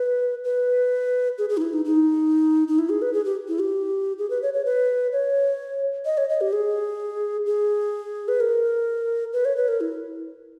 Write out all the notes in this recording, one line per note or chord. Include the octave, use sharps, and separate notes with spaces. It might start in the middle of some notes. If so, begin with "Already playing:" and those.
Already playing: B4
B4
G#4
G#4
D#4
E4
D#4
D#4
D#4
E4
G#4
B4
G#4
G4
E4
G4
G#4
B4
C#5
C#5
B4
C#5
D#5
C#5
D#5
G4
G#4
G#4
B4
A#4
B4
C#5
B4
A#4
E4